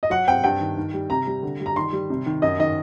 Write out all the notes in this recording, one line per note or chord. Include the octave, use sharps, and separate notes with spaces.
D#5
F#3 F#5
C4 G5
G2 G5
D#3
D#3
G3
C3 A#5
G3
D3
G3
A#5
D#3 C6
G3
C3
D#3
F#2 D#5
D#3 D#5